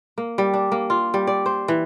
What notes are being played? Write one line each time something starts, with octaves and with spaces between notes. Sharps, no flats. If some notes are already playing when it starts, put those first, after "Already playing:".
A#3
G3
D4
A#3
F4
G3
D5
C5
E3